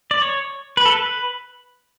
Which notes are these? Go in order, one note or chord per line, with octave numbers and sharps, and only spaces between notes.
D5
C#5
B4
A4
B4